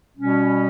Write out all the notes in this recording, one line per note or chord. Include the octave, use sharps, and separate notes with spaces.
B2 G3 C#4